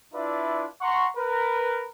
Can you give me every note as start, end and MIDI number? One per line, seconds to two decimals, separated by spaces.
0.14 0.64 62
0.14 0.64 64
0.14 0.64 65
0.14 0.64 71
0.14 0.64 74
0.14 0.64 76
0.81 1.06 78
0.81 1.06 82
0.81 1.06 84
0.81 1.06 85
1.17 1.87 70
1.17 1.87 71